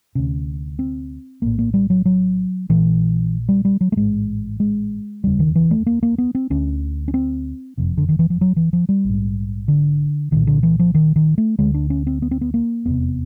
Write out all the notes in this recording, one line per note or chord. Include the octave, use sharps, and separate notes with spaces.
D2 C3 C#4
C4
A#1 A2 A#3
A#3
G3
F#3
F#3
A#1 A#2 E3
G3
G3
F#3
A3
A1 G#2 G#3
G#3
F1 D#2 C#3 G3
D#3
E3
A3
A#3
A#3
B3
C4
D2 D3 C#4
C#4
C4
F#1 F2 C3
D3
D#3
E3
F3
F#3
E3
F3
G3
A#1 G#2
D3
C2 A#2 D#3
D3
E3
F3
D#3
D#3
A3
D2 D3 G#3
D4
C#4
C4
B3
C4
B3
A#3
F1 E2 C3 B3